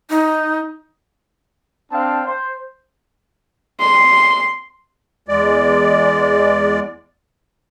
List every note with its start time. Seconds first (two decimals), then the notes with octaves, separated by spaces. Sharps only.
0.10 D#4
1.92 C4 D4 F5 G5 A5
2.26 C5
3.81 C6
5.28 E2 G#3 D5